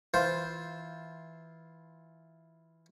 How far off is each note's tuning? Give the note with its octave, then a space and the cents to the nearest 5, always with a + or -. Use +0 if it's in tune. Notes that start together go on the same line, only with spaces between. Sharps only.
E3 -10 F4 +0 C5 +0